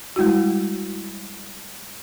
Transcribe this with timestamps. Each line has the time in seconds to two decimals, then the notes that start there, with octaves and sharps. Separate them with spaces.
0.16 G3 G#3 E4 F#4